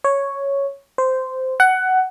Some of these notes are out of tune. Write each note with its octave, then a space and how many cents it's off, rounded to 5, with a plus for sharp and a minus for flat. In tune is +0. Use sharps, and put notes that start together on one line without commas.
C#5 +0
C5 -10
F#5 +15